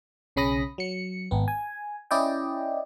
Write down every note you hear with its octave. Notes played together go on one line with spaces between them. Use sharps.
B1 C#3 C#4 B5 D#6 A#6
F#3 C#7
G#1 B3
G#5
C#4 E4 D5 D#5 G5